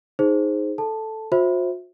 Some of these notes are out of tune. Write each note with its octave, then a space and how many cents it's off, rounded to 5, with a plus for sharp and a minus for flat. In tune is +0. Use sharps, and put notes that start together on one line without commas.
D#4 +5 G#4 +0 C5 +0
A4 +0 A5 +0
F#4 -45 C5 +20 E5 -5